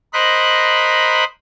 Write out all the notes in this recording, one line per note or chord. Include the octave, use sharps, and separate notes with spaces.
A#4 C5 D#5 B5 F#6